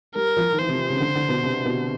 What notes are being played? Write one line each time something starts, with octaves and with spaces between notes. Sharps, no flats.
G3 A#4
F3
D#3
E3 C5
C3
C#3
D3
D3
B2
C3
B2